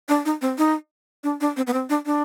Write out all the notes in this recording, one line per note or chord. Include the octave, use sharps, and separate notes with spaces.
D4
D#4
C4
D#4
D4
D4
C4
B3
C4
D4
D4